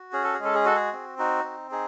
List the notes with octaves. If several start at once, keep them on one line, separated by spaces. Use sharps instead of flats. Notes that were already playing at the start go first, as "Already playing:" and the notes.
Already playing: F#4
C#4 G#4
A4
G#4
G#3
A4
G#4
F#4 A4
G#4
C4
D#4 F#4
C4
D#4 G#4